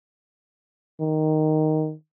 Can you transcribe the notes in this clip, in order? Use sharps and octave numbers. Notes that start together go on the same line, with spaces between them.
D#3